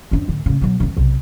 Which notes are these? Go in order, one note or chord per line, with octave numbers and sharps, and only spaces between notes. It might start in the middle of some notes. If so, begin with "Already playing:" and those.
F2 D4
A2 D3
A2 C#3
B2 F#3
E1 E3
B1 C3